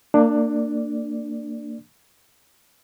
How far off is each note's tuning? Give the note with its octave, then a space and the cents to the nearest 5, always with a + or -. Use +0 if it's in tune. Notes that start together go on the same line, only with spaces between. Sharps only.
A#3 -25 D4 +15 D5 +0